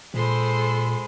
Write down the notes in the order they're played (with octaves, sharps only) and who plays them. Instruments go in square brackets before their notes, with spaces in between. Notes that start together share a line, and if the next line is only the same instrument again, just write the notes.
[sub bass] A#2 [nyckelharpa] G#3 B5 [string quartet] A4 C5 C6